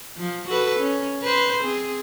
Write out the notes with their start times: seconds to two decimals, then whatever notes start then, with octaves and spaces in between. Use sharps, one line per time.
0.17 F3
0.49 F#4 A4 B4
0.80 C#4
1.23 B4 C5
1.60 C4 G#4